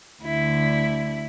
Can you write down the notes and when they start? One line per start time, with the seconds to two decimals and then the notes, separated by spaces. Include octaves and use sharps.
0.23 D2 D3 E4